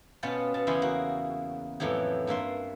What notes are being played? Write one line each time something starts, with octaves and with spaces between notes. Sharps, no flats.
B2 B3 C#4 F4 G5 A5
B2 A5
E2 C#3 E4 G4 G#5 C6
A#3 F#4
F2 A2 E3 F#3 G4
G2 A#3 E5 C6